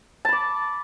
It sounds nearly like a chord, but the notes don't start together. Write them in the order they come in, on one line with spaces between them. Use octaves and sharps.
A5 B5 D6